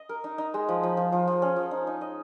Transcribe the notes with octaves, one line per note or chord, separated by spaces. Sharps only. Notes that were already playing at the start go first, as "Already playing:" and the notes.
Already playing: D#5
A#4
D#4
D#4
G#3
F3
F3
F3
F3
F3
C#4
F3
D#4
D#4
D#5